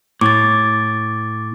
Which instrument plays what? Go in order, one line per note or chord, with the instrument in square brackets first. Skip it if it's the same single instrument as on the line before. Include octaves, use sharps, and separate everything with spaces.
[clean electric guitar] A2 [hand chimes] D6 A6